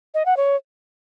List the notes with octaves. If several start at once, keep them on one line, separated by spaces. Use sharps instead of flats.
D#5
F#5
C#5